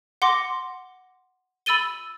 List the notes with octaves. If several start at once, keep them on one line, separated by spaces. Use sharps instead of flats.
F#5 C6 D6 A#6
B5 E6 A6 D#7 G7